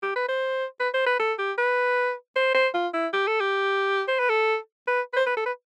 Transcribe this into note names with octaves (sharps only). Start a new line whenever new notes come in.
G4
B4
C5
B4
C5
B4
A4
G4
B4
C5
C5
F4
E4
G4
A4
G4
C5
B4
A4
B4
B4
C5
B4
A4
B4